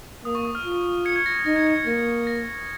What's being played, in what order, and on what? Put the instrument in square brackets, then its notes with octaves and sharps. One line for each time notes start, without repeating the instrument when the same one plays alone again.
[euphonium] A#3 [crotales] D#6
[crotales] C#6
D#6
F6
[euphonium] F4
[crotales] G#6 C#7
G#6 C#7
A#6
G#6
[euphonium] D#4 [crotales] A#6
[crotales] G#6 C#7
G#6 C#7
C#7
[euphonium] A#3 [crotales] A#6
[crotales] A#6